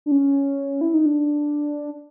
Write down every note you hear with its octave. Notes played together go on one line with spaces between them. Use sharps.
D4
C#4
E4
D#4
D4